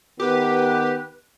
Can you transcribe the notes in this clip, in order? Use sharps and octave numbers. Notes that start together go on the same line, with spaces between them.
D#3 B3 G4 B4